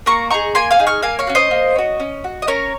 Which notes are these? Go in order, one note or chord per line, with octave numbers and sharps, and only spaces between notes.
A#3 A#5 C#6
D#4 G#4 A#5 C#6
A#3 G#5 C6
F5 G#5
D#4 G#4
C#6 F6
A#3 F5 G#5
C#5 F5
C#4 F#4
C5 D#5
A#3
C#4 F#4
C#4
F#4
D#5
C#4 A#4 C#5